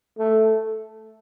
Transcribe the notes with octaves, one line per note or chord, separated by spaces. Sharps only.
A3